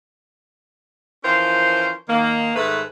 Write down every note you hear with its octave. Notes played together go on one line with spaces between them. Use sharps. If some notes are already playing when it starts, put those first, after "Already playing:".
E3 F3 C#4 F4 A#4 C5
D#3 A#3
G#2 D#3 A3 B4